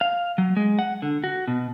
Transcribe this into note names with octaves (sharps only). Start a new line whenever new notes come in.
F5
F#3
G#3
F#5
D3
F#4
B2